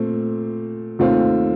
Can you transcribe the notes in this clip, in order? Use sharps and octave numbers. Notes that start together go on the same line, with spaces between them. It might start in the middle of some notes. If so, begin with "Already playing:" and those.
Already playing: A#2 A3 C4
D#2 D#3 A3 C4 F4